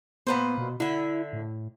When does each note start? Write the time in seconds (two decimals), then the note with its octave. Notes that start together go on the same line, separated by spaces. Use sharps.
0.27 A#2 B3 B4 C5
0.58 B2
0.80 D3 E4 E5
1.33 A2